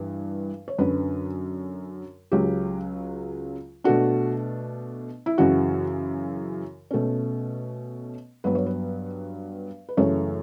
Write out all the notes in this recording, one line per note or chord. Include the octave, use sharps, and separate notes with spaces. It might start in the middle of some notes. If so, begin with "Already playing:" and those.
Already playing: G2 E3
C#5
F#2 D3 F#3 C#4 B4
C#2 C#3 F#3 G4
B2 A3 D4 F#4
E4
F#2 C#3 E3 F#4
B2 A3 C#4
G2 F#3 B3 B4
C#5
B4
B4
F#2 C#3 E3 A3 C#5